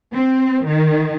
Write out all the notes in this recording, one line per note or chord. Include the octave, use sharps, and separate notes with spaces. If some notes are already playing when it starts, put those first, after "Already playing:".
C4
D#3